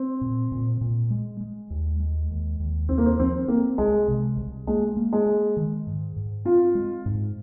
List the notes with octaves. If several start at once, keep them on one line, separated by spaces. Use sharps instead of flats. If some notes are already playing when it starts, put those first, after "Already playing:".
Already playing: C4
A#2
A#2
A#2
G#3
G#3
D#2
G#3
D#2
D#2
C2 C4
A#3
C4
F3 C4
A#3 C4
C2 G#3
C3
C2
G#3 A#3
A#3
G#3
A#3
D#3
G#2
G#2
C4 F4
G#3
G#2